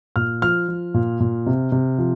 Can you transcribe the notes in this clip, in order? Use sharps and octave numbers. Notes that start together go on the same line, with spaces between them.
A#2 F6
F3 F6
F3
A#2
A#2
C3
C3
F3